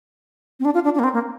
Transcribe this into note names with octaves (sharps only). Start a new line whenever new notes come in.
C4
D4
F4
D4
D4
A#3
C4
A#3